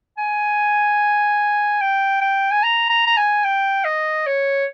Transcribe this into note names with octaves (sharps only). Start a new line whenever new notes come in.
G#5
G5
G5
G#5
A#5
A#5
A#5
G#5
G5
D#5
C#5